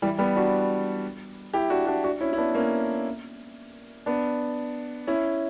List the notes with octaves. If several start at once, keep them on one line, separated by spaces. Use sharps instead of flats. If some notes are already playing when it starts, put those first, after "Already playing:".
E3 G3
G3 B3
D4 F#4
E4 G4
D4 F#4
D4 F#4
D4 F#4
C#4 E4
E4
B3 D4
A#3 C#4
B3 D4
C#4 E4